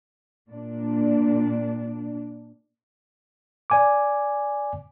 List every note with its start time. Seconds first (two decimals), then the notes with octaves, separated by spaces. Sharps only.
0.49 A#2 D4
3.70 D5 G#5 D6